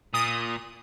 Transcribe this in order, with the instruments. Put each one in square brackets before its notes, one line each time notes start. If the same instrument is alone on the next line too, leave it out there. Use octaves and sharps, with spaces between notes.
[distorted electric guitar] A#2 [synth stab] D#6